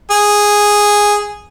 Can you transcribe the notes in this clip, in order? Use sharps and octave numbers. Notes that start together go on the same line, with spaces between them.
G#4